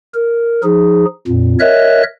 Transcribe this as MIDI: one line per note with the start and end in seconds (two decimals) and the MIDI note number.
0.14 0.61 70
0.64 1.05 53
0.64 1.05 63
0.64 1.05 68
1.28 1.56 41
1.28 1.56 46
1.60 2.03 70
1.60 2.03 73
1.60 2.03 75
1.60 2.03 76
1.60 2.03 90